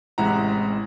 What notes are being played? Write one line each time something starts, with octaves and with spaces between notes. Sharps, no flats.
A1 C3 G#3 E4 F#5 A#5